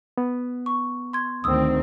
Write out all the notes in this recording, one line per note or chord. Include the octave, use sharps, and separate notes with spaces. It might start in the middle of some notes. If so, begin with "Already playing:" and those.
B3
C#6
C6 G#6
D2 D#3 C4 D#6 E6